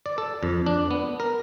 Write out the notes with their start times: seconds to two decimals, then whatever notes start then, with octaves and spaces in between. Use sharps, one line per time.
0.06 D5
0.18 A4
0.43 F2
0.66 D4
0.91 B3
1.20 A#4